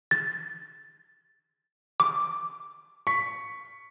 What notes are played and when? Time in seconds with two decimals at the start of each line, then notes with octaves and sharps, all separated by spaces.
0.11 A6
2.00 D6
3.07 C#6 B6